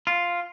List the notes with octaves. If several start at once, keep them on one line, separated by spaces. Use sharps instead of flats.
F4